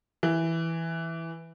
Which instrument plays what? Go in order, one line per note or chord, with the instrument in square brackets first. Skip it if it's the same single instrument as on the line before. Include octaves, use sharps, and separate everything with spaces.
[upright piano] E3